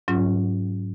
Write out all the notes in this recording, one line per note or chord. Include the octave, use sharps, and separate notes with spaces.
G#2 F#3 C#4 F4